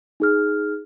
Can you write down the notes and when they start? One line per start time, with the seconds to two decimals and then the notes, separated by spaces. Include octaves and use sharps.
0.20 D#4 G#4 F6